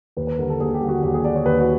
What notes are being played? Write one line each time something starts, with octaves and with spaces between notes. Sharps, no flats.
D#2 B4
B4
D3 G3 A#4
A4
D#2 G#4
G4
D3 G3
F#4
D#2 G4
G#4
D3 G3 D5
C#5
D#2 B4
F#4